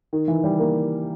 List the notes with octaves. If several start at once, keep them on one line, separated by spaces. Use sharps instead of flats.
D#3
E3
G3
A#3